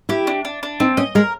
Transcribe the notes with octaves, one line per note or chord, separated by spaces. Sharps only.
E4 G4
D4
D4
D4
C4 D#4
C#4 D#5
G#3 A#4